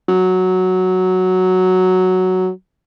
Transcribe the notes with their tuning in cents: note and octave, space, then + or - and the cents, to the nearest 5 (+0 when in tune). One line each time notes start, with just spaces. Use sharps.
F#3 +0